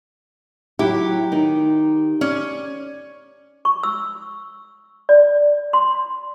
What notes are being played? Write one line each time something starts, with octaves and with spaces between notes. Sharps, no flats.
F#3 E4 G4
D#3 D#4
C#4 D5
C#6
E6
D5
C6